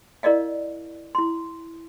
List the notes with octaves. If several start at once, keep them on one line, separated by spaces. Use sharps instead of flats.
E4 A#4 D5 D#5 F5
E4 C6